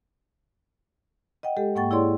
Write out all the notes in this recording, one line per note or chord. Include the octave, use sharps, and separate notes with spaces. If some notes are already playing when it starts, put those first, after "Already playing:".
D#5 F#5 G5
G#3 G4 A4
G#2 A#3 F#5 G5 C#6 A6
E4 G#4 C#5 D5 C6